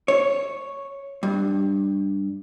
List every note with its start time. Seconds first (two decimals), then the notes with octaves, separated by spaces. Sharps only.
0.08 C#5
1.23 G2